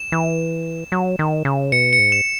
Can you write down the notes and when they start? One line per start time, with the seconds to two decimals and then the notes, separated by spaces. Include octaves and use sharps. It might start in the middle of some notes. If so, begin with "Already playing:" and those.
Already playing: E7
0.12 E3
0.92 F#3
1.19 D#3
1.45 C#3
1.72 B2 C#7
1.93 C#7
1.99 G#2
2.12 E7